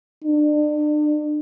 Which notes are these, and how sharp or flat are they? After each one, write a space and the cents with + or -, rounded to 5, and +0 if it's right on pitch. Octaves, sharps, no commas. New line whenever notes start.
D4 +35